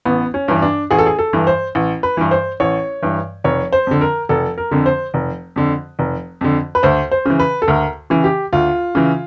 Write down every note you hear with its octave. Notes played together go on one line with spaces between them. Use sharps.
A1 B3
C#4
G2 E3
D4
A1 G#4
A4
G#4
A4
G2 E3
C5
A1
B4
G2 E3
C5
A1 C#5
G2 E3
F1 C#5
C5
F2 D3
A#4
F1 A4
A#4
F2 D3
C5
F1
F2 D3
F1
F2 D3
B4
D2 C5
C5
C#3 E3
B4
A4
D2 A#4
C#3 E3
G4
D2 F4
C#3 E3